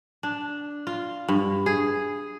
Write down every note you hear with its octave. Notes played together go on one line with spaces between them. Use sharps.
D4
F4
G2
G#4